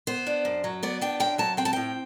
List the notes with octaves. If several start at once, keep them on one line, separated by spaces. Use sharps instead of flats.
B3 C5
D4
F#2
F#3
B3 D5
D4 G5
F#2 G5
F#3 A5
C4 G5
A5
A2 G5